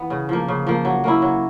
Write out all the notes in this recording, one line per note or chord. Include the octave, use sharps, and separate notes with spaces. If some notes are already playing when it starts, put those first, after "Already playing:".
Already playing: E3 B3
C#3
F3 A#3
C#3
F3 A#3
F#3
A#3 C#4 E4
F#3